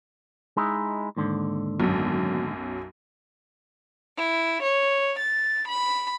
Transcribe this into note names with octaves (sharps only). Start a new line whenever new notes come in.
G#3 D#4 E4
D#2 G#2 D3
B1 F#2
E4
C#5
A6
B5